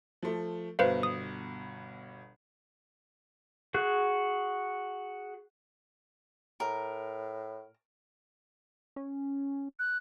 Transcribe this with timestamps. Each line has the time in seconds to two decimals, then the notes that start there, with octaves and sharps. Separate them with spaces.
0.23 F3 A3
0.79 G1 B2 B4 C5 F5
1.03 D#6
3.74 F#4 G#4 F#6
6.60 A2 A#4
8.96 C#4
9.79 F#6